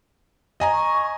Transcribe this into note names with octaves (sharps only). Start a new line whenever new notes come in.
D#5 G#5 A#5
C#6